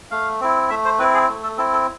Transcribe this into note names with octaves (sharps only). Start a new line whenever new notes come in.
A3 F5
C4 E4
A3 E5
C5
C4 E4 B4
G#4
A3
A4
C4 E4 A4
A4